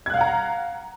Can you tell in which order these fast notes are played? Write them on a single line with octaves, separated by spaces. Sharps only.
G#6 F#6 F5 F#5 A#5